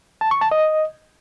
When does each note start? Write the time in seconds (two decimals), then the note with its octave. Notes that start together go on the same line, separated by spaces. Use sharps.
0.21 A5
0.31 C#6
0.41 A5
0.51 D#5